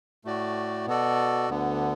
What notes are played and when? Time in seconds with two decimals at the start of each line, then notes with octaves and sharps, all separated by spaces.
0.25 A2 A3 F#4 D5
0.86 B2 B3 F#4 A4 D5
1.49 D2 D3 B3